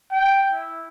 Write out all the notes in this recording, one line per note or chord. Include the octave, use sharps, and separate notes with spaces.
G5
E4